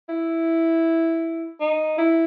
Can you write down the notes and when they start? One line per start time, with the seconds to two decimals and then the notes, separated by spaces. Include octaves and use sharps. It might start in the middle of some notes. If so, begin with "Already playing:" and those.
0.09 E4
1.60 D#4
1.98 E4